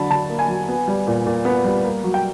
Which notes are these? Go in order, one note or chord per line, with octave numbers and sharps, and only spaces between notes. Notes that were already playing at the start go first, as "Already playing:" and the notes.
Already playing: D3 F#3 A5 B5
D3 A5
A#3
G#5
F#3
B3
G3
A#2
A#2
B3
G3
A#3
F#3
G5